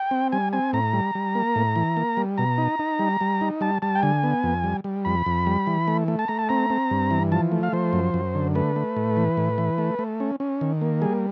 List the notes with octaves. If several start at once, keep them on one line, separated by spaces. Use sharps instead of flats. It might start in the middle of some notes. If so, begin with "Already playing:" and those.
Already playing: G5
C4
G3 G#5
C4 G#5
A2 A#5
G3
G3
A#3
A2
E3
A#3
G3
B2 A#5
D#4
D#4
G3
G3
D#4
G3 A5
G3 A5
G5
D3 G#5
B3
F2
G3
G3
F2 B5
F2
G3
E3
A3
A3
A5
A3 A#5
A5
C4 A#5
C4
G2
E3
F3 A5
A3
F5
F3 C5
F#2
F#2
D3
A3 B4
A3
A2
E3
A2
E3
A3
A3
C#4
C#4
D#3
A#3
G3 G#4